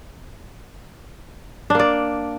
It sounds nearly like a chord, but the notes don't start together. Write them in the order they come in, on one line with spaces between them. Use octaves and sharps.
D4 A#3 D5